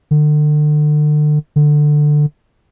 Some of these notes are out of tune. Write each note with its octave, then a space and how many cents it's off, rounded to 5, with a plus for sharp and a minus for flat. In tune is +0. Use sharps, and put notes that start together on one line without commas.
D3 +35
D3 +15